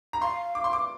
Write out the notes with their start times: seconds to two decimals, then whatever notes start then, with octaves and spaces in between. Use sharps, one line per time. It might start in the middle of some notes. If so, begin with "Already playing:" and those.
0.13 A#5
0.22 F5 C6
0.55 D6
0.64 C6
0.73 D6